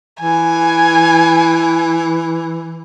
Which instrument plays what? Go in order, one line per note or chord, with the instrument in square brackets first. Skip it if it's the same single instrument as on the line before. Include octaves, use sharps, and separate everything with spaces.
[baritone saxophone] E3 [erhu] G#5